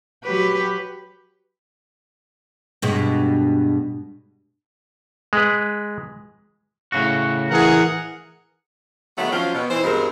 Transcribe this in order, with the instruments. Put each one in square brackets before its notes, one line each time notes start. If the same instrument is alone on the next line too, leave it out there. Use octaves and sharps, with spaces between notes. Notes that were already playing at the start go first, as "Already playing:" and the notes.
[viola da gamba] F#3 G4 B4
[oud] G2 B2 G#3
[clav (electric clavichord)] G#3 B4
[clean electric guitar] A2 C#3 F#4
[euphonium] E3 [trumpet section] G#4 A#4 F#5
[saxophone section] D3 D#3 F#3 G#3 A3 B3
F3 F#3 C4 C#4 F4
B2
E3 C4 C5
G2 B2 G#3 C4 A#4